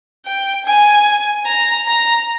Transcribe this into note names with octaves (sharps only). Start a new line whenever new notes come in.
G5
G#5
A#5
A#5